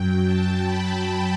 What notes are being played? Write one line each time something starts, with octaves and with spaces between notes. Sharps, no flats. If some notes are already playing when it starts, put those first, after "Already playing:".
Already playing: F#2 F#3 G5
A5
B5